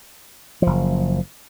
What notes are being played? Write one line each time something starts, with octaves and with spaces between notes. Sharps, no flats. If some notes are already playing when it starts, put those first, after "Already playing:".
F#1 F3